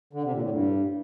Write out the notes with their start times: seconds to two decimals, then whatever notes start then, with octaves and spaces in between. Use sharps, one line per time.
0.13 D3
0.22 C3
0.32 A#2
0.41 A2
0.50 G2